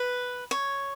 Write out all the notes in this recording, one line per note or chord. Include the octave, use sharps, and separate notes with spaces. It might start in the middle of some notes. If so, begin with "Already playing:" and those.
Already playing: B4
C#5